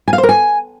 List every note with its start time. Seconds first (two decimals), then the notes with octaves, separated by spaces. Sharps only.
0.08 G#5
0.13 F5
0.18 C5
0.23 A#4
0.29 G#5